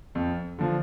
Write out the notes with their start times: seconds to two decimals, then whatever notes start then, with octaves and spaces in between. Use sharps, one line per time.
0.15 F2
0.59 D3 F3